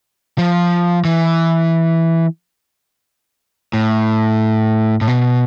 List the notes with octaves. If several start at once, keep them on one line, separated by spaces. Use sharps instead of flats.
F3
E3
A2
A2
B2